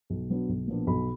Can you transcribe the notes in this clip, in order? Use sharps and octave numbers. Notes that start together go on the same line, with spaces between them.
B1
B2 F#3 B3 D4
B1
A#2 F3 B3 D4
B1 B5